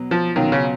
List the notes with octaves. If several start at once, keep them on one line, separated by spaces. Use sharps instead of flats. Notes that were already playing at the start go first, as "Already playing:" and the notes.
Already playing: B2 F#3 B3
F3
B2 D#3 F#3 C#4 F4
C#3